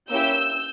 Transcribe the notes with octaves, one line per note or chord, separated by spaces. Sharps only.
A#3 C#4 E4 G4 E6 G6